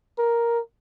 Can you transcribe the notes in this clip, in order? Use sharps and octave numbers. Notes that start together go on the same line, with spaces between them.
A#4